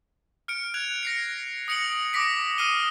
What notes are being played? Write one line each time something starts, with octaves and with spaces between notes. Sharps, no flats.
F6 C#7 D7
F#6 G#6 F7
A#6 C7 C#7
D#6 A#6 C#7 D7 F#7
D6 D#6 A#6 B6 D7
D#6 F6 C7 D#7 G7